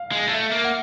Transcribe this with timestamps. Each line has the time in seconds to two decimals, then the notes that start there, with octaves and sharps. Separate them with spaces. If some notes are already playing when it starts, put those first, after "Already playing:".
Already playing: F5
0.12 G#3
0.28 A3 E5
0.52 A#3
0.64 F#5